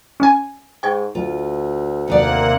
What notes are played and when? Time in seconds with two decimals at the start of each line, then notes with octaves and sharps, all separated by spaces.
0.20 C#4 G#5
0.83 G#2 G5 C#6 G#6
1.15 D2 F4
2.08 D#2 C3 A#3 D#4 D5 F#5